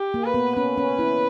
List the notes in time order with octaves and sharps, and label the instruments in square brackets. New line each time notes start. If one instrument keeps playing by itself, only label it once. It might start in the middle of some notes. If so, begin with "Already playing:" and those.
Already playing: [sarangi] G4
[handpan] A#3
[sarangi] B4
[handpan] B3
[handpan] C#4 [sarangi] B4
[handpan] C#4
E4